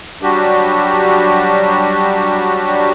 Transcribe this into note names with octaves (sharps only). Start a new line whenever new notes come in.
F#3 G3 D4 F#4 G4